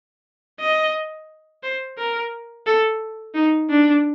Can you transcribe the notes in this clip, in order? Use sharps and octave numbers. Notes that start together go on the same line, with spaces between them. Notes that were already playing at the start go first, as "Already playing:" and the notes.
D#5
C5
A#4
A4
D#4
D4